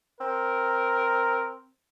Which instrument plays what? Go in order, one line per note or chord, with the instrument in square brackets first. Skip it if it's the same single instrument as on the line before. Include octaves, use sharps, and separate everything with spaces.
[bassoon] C4 [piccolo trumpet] A#4